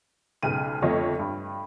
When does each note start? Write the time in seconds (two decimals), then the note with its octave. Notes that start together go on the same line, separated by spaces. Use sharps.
0.43 B1 G#2 C#3 G5 D#7
0.82 G1 F2 A3 C#5 D#5
1.19 G2